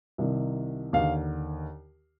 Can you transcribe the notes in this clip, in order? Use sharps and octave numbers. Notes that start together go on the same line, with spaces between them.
C2 C3 D#3
D#2 D3 F5